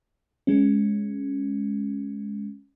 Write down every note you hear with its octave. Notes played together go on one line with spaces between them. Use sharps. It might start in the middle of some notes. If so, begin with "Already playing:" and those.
G#3 C#4